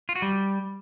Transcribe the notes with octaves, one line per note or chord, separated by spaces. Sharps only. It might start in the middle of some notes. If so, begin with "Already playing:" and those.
F4
F#4
G3